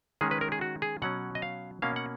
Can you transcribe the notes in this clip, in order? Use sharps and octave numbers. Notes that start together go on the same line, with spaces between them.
D#3 G#3 C#4 G#4
B4
A#4
G#4
F#4
G#4
B2 F#3 C#4 F#5
D#5
F5
B2 A#3 C#4 F5
F#5